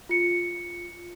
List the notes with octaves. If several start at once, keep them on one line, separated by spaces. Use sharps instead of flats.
F4 C#7